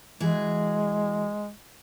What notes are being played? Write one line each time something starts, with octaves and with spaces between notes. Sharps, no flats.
E3 G#3 F#4 G#4